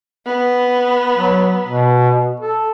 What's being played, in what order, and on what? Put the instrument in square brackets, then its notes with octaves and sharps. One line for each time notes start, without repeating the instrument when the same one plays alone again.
[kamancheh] B3
[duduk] F#3
B2
A4